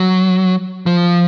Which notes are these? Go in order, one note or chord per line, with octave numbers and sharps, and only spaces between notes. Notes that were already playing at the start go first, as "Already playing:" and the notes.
Already playing: F#3
F3